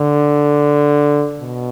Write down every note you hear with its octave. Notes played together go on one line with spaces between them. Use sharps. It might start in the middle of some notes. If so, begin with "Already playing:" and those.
Already playing: D3
B2